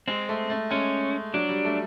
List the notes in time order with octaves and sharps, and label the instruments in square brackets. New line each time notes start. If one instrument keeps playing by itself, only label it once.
[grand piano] G#3 [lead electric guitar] C4
[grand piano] A3
A3
[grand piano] G#3 [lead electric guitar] C#4
[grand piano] F#3 [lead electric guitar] D4
[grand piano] G3
A3